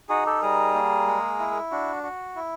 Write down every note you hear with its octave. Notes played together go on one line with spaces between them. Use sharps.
D#4 F#4 G#4
G4 A4
G3 G#4 A#4
A#3
G#3
E4
D4 F#4
F#4
E4